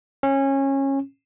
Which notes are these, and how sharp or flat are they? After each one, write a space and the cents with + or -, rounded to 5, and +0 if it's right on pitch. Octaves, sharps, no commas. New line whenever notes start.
C#4 -20